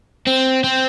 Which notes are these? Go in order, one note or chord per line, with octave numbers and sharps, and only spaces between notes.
C4
C4